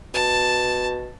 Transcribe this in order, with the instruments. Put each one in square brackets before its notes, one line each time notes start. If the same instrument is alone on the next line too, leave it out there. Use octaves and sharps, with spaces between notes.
[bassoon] B2 [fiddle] A5